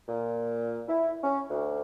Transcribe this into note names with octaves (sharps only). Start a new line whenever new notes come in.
A#2
E4
C#4
D2